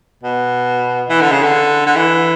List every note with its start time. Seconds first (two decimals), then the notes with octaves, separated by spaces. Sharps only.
0.23 B2
1.09 E3
1.21 D3
1.32 C#3
1.43 D3
1.86 D3
1.96 E3